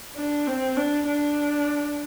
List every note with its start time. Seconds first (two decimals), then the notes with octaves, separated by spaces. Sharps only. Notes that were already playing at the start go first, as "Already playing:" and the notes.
0.16 D4
0.47 C4
0.76 D4
1.07 D4